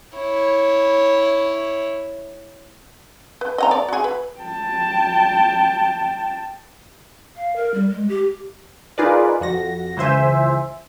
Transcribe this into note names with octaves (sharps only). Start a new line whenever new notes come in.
E4 C#5
B4
D#5 F#5 A#5
D5
F#4 G#4
B4
G5 A5
F5
A#4
G3
G#3
G4
D#4 F4 G#4 A#4 B4 D5
F2 F#4 A#6
C#2 E3 C5 E5 G#5